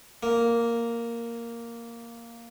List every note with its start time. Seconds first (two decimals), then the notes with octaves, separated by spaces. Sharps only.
0.23 A#3